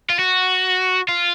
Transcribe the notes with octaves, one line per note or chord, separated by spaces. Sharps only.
F4
F#4
F4